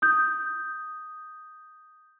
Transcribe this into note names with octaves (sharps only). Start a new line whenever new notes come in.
D#6 G6